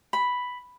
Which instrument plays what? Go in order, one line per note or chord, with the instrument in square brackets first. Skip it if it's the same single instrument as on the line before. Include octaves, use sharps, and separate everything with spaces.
[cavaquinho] B5